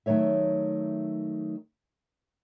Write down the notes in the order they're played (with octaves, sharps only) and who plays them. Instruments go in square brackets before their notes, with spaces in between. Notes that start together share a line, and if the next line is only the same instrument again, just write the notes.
[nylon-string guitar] D#3 F#3 A3 C#5 E5